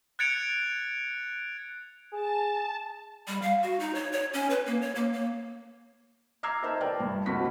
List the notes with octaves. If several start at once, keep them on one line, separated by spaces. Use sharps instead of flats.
F#6 G#6 A6 C#7 D7 F7
G#4 A5
G3
F5
F#4
D#4
C#5
C#5
C#4
B4
A#3
C#5
A#3
A#3
A#5 D6 E6 F6 G#6 C7
D#4 A#4 C5 E5 A5 A#5
A#4 B4 D5 G5 A5
G1 G2
F#1 D2 C3 F#4 B6